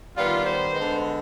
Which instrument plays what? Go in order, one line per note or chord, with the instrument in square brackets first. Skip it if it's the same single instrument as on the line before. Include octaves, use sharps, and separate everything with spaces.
[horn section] D#3 G3 B3 F4
C5
D3 G#3 B3